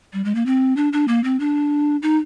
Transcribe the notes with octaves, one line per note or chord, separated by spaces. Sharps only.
G3
G#3
A#3
C4
D4
D4
A#3
C4
D4
D#4